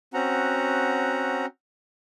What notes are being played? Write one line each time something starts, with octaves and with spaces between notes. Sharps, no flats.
C4 C#4 F#4 F#5 A#5